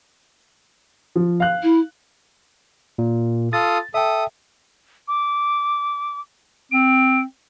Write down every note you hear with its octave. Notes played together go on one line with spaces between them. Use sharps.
F3
F5 F#6
E4
A#2
F4 A4 D#6 A6
A4 E5 G5 D#6
D6
C4 D7